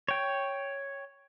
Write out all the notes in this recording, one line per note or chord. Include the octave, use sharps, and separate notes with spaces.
C#5 G5